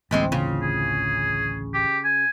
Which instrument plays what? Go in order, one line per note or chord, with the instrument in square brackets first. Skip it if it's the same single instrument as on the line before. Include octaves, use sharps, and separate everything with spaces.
[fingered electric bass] A1 D2 E3 [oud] G3 G#3 C4
[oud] C#3 F4
[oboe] G#4
G4
G#5